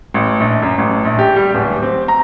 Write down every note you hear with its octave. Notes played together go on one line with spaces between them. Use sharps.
A1
A#1
F#2
A1
A#1
G4
G3
D1
C4
A#5